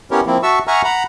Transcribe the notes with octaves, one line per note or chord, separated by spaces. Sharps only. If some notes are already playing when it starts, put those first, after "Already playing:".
B3 C#4 E4 G4 A#4 C#5
F3 A#3 C4 E4
F#4 E5 A5 C#6 E6
E5 F#5 G#5 A#5 C#6 F6
F#5 A#5 B5